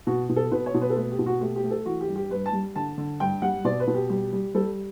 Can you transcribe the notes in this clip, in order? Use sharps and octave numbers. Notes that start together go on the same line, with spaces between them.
B2 F#4
B2
A4
B2 B4
C#5
B2
B4
A4
A3 B4
G4
B2
F#4
A3 G4
G4
A3
A4
E3 F#4
G4
G2
G4
G2 B4
A5
G3
D3 A5
D3
G2 G5
G3 F#5
B2 D5
B4
B2
G4
G3 G4
G3
G3 A4